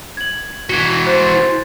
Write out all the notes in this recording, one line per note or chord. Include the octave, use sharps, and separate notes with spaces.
G#6 F#7
E3 F#4 G#6 G7
C5 F#6 A6